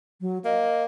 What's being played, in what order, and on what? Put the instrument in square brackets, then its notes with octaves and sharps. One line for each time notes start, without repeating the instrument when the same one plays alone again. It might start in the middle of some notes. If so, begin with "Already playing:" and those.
[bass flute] F#3
[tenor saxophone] A#3 [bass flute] D#5